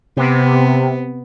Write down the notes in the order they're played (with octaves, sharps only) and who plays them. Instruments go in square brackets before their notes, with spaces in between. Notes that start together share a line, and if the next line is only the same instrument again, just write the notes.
[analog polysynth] C3 [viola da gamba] B3